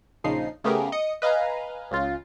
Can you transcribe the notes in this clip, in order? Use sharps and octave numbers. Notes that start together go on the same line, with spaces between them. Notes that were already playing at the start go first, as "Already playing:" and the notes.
A#1 C#3 F3 D#4 C7
C#3 A3 B3 G4 G#4 A#4
D#5 D#6 C#7
B4 D#5 F5 G#5 A#5
C#2 C#3 F4